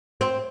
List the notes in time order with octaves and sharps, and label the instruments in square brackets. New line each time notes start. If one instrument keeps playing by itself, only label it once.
[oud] C4